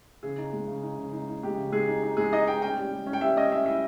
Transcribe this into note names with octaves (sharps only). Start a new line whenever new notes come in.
C#3 G#4
D#4
G#3
C#3
D#4
C#3
D#4
D#4
G#3 G4
C#3
G#3 G#4
D#4
D#4
G#3 G#4
D#4 D#5
D#4 G5
C#4 G5
G3
G3
C#4
G5
G3 E5
C#4 D#5
C#4 E5
E4 E5